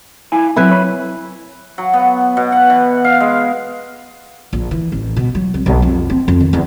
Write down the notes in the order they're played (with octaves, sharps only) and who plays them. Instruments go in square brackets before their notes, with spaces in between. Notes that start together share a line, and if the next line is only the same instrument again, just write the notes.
[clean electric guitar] E4 F5 G#5
[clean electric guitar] F#3 C4 [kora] E4 B4
[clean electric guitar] C#5 B5
[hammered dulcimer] F#3
B3
B2
F#5
E3
F5
G#3
[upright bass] A#1
E3
A1
B2
F#3
C2
B1
F2
C4
F2
D#3
E2